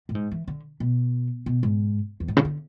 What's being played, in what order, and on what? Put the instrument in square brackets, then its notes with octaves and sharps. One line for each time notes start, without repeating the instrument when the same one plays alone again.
[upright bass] A2
G#2
E3
D3
B2
B2
G#2
E2
G#2
C#3
D3